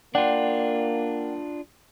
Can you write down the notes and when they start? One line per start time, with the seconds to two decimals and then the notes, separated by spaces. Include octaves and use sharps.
0.15 A#3 D4 F4 D5 F#5 G5